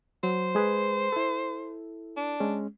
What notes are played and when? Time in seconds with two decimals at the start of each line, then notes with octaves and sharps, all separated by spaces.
0.23 F#3 C5
0.55 G#3 G#4 B4
1.12 E4 A4
2.17 D4
2.40 G#3 C#4